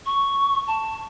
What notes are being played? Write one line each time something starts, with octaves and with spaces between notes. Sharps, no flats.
C#6
A5